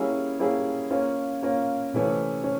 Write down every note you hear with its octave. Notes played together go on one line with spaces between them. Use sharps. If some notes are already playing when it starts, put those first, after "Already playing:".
Already playing: G3 A#3 C#4 E4 G#4
G3 A#3 C#4 E4 G#4
A#3 C#4 F4
A#3 C#4 F4
C3 E3 A3 C#4
C#4